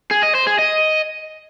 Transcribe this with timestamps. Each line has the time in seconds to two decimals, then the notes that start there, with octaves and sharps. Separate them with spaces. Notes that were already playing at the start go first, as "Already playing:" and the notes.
0.11 G#4
0.23 D#5
0.35 C5
0.47 G#4
0.59 D#5